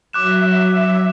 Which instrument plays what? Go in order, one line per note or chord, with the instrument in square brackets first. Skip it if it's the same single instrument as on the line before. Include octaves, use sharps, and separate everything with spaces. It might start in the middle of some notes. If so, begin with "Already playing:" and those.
[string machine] F#3 E5 [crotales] D6 F#6 E7